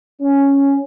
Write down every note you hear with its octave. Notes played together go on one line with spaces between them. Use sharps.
C#4